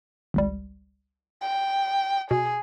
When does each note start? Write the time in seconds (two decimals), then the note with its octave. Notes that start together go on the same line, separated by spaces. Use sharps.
0.34 G#1 C#2 G3
1.42 G5
2.31 B2 G#4